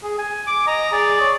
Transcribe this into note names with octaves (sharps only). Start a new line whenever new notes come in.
G#4
G#5
D6
D#5 A#5
G#4 D5
C#5